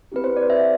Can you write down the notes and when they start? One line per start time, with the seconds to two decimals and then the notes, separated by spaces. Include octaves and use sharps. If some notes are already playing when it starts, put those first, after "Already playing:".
0.12 C4 E4 G4 B4
0.24 C5
0.36 D5
0.50 E5